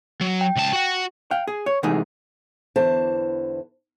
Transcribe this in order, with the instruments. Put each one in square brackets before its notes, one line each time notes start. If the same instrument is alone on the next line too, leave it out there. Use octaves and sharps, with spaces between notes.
[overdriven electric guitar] F#3
[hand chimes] G5
[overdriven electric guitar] C#2 A5
F#4 F#5
[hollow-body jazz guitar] F5 G5
G#4
C#5
C3 E3 G#3 A3 D#4 G#4
[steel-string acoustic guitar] E2 D3 E3 C5 A5